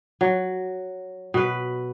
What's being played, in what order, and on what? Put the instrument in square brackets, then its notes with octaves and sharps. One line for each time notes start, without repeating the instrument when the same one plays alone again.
[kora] F#3
B2 B4